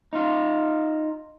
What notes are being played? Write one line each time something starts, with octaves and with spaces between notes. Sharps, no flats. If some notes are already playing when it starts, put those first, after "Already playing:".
D#4 F4